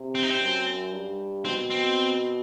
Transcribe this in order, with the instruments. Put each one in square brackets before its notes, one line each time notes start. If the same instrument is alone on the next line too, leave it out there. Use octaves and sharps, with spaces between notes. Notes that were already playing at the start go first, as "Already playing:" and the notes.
Already playing: [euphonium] C3
[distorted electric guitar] C4
D#4
C4
[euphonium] F#2
G2
[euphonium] B2 [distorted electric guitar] C4
[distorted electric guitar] C4